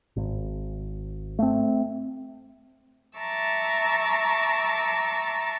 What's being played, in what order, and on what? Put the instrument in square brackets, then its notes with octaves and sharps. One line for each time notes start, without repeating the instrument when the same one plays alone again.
[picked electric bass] G#1
A3 C4
[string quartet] E5 A5 A#5 C#6 D6 E6